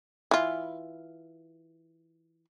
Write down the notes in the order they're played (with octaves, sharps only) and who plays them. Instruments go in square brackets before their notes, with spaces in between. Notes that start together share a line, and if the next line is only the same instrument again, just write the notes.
[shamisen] E3 F4